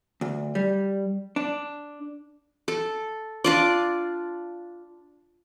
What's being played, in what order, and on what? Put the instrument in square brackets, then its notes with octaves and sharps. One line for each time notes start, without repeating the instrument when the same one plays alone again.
[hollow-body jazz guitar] D2
G3
D4
[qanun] A4
D4 F4 D5